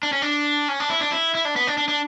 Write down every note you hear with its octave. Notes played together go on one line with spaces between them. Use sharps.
D4
C#4
D4
C#4
D4
E4
D4
E4
E4
D4
B3
D4
D4
D4